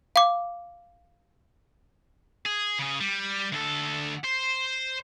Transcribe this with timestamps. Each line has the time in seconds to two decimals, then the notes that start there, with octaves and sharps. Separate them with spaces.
0.16 F5 D6
2.45 G#4
2.79 C#3 G#4
3.00 G3
3.52 D2 A4
4.24 C5